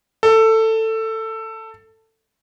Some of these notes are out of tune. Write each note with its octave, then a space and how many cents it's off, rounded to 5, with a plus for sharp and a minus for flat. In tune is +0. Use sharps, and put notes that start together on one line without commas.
A4 +15